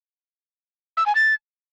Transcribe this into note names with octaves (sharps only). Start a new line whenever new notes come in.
E6
G#5
A6